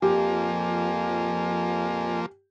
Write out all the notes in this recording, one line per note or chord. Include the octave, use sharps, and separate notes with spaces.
F2 F3 A#3 G4 G#5